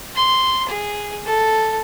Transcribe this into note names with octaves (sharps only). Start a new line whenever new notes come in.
C6
G#4
A4